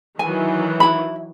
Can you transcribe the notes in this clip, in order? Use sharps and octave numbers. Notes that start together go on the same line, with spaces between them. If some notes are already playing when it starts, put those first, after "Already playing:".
D#3 E3 F#3 G#5
E4 B5